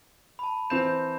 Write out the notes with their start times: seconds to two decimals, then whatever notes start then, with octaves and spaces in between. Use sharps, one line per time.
0.39 A5 B5
0.70 E3 C4 G6 E7